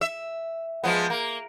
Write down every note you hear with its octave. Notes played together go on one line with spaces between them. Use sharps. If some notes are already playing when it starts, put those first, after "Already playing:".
E5
F3 G#3 B3
A#3